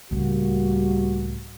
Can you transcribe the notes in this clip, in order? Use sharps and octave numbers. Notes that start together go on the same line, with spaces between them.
C#2 A2 G3 A#3 F#4